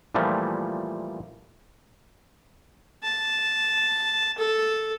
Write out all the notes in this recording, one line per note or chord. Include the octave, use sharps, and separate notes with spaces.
A#2 E3 F3 G3 A3
A5
A4